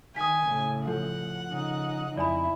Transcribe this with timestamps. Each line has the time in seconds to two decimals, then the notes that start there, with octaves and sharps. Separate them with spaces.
0.16 D#3 G#5 D#6 B6
0.46 A2 C#3
0.88 F3 A4 F#5
1.50 C#3 D#4
2.17 F2 E4 D5 G#5 B5